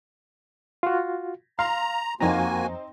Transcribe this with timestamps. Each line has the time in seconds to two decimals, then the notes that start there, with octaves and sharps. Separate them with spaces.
0.83 F4 F#4
1.59 F5 A#5 C6
2.21 F2 A#3 C4 D#4 F#4 C5 G#5 A#5